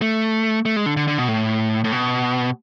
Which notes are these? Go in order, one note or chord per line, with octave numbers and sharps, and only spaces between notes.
A3
A3
G#3
D3
D3
D3
B2
A2
A2
B2